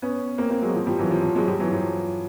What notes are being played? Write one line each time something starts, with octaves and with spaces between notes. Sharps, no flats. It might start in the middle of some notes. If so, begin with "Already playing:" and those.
B3 C#4
A#3 C4
A#3 C4
F#3 G#3
F3
F3 G3
E3 F#3
F3
F3
F#3 G#3
F3 G3
E3 F#3
F3